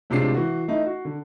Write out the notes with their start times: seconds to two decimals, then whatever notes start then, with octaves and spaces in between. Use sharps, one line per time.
0.10 A2 C3 G#3 D4 F4 C7
0.34 E3 F#4
0.68 A3 D#4 E4
0.86 F#4
1.05 D3